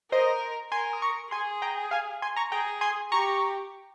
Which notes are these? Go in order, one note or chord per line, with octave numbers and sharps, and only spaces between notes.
A#4 C5 D#5
A#4 G#5 C6
D#6
A#5 C#6
G#4 G#5 C6
G5 A#5
F5 G#5
G#5 C6
A#5 C#6
G#4 G5 A#5
G#5 C6
G4 A#5 C#6